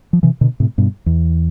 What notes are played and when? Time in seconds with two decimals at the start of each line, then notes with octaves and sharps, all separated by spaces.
0.13 F3
0.23 C3 E3
0.41 B2 D3
0.60 A2 C3
0.78 G2 B2
1.06 E2